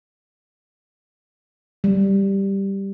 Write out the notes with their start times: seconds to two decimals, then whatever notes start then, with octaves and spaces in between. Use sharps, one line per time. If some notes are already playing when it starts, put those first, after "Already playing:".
1.84 G3